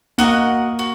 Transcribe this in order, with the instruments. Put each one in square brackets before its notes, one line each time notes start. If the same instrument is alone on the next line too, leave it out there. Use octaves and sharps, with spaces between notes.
[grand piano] A#3 [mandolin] F#4 A#4 D#5 F#5
[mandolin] F#4